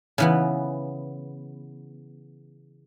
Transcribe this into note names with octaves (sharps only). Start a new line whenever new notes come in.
C#3 E3 B3